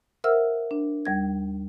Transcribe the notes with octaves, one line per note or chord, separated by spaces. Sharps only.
A#4 C5 E5 F#5 E6 F6
D4
D#2 G3 G#6